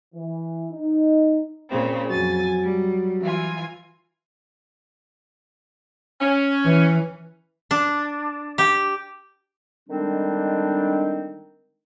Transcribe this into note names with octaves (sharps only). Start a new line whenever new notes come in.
E3
D#4
A#2 C#3 C4
F2 F#3 G#5 A6
G3
E3 F4 G#5
C#4
E3
D4
G4
D3 D#3 G3 G#3 C4 D4